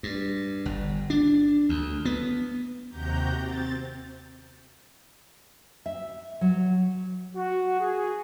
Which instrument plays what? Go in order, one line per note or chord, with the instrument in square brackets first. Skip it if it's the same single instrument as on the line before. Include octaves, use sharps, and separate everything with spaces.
[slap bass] G2
G1
D4
D2
B3
[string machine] D#2 C3 F#4 G4 A#5 G6
C4 A6
[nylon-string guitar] E5
F#3
[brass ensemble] F#4
G#4